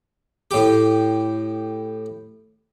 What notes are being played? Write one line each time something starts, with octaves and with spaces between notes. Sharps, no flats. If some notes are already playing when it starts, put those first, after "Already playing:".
A2 G4